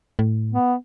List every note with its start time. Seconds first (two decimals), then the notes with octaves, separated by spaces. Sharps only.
0.19 A2
0.52 B3